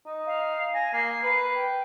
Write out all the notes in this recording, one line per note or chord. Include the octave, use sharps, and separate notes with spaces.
D#4
F5
G#5 A#6
A#3 C7
B4
G5